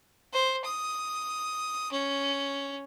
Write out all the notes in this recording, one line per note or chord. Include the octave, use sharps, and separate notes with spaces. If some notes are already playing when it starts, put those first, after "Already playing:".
C5
D#6
C#4